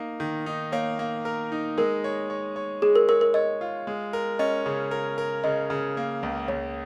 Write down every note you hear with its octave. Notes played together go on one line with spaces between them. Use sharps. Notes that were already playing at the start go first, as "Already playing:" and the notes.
Already playing: A#3 D#4
D#3
D#4
A#3 C#5
A#3
A#4
D#4
G#3 A#4
C#5
C#5
C#5
G#3 G#4
A#4
A#4 C#5
A#4
C#5 D#5
F4
G#3
A#4
C#4 D#5
C#3
A#4
A#4
C#3 D#5
C#3
A#3
C#2
C#2 C#5